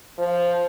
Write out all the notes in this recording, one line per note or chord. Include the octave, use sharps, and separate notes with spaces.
F3 C5